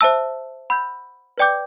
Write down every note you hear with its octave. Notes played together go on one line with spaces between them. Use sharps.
C5 E5 A5 E6
F#5 B5 E6 G6
B4 D5 G5 D6 G6